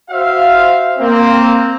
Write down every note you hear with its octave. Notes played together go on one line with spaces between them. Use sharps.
F#4 C5 E5 F5
A#3 C4